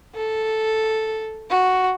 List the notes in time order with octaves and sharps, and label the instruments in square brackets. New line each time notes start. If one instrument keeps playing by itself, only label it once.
[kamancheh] A4
F#4